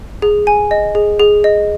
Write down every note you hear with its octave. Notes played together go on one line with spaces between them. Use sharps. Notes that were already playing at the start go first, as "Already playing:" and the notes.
G#4
G#5
D#5
G#4
G#4
D#5